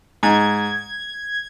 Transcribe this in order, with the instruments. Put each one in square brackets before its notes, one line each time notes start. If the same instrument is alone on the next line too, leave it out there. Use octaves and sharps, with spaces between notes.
[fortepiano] G#2 [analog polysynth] G#6